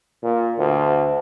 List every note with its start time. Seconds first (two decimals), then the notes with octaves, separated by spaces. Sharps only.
0.24 A#2
0.59 D2